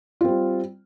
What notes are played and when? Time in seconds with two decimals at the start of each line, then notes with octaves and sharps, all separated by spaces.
0.21 F4
0.24 C4
0.28 G3